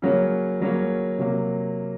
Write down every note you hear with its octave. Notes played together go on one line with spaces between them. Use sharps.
C#3 F#3 A#3 C#4
C#3 F#3 A#3 C#4
C3 F#3 A#3